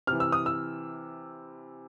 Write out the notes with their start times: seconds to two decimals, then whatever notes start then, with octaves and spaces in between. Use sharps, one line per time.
0.07 C3 F6
0.12 E3
0.20 E6
0.32 D#6
0.46 E6